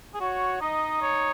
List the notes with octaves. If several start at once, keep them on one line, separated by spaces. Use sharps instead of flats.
G#4
F#4 C#5
D#4 D#5
C#5